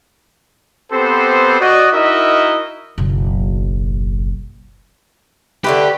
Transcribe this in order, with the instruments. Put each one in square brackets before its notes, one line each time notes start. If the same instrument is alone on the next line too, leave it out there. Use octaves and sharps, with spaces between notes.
[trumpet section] B3 C4 G4 A4 B4 C5
F#4 D5 D#5
D#4 E4 F#4 A#4 D#5 E5
[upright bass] F#1 B1
[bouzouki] D3 A3 B4 [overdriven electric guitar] G4